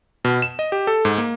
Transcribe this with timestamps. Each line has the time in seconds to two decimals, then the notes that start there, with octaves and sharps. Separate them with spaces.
0.25 B2
0.42 E7
0.59 D#5
0.72 G4
0.87 A4
1.05 G#2
1.18 A#3